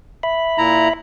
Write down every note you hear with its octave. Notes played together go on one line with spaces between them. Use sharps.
E5 B5
A#2 E4 A#5